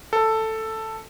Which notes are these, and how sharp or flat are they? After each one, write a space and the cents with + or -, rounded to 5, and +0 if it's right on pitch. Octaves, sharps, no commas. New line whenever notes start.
A4 +5